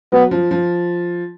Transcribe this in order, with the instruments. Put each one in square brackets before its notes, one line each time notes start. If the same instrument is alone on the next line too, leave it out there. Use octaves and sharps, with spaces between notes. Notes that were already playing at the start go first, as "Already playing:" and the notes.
[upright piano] F#3 [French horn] B3
[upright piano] F3
F3